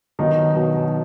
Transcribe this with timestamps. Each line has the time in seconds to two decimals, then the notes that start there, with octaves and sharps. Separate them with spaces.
0.19 B1 B2 D#3 F#3 D#4
0.54 B1 B2 F#3